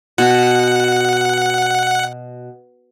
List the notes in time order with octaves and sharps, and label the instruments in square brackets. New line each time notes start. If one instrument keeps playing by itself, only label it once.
[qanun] B2 [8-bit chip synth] F#5